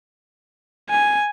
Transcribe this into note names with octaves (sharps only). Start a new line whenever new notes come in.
G#5